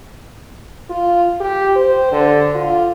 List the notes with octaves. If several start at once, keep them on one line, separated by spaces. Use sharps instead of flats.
F4
G4
C5
D3
F4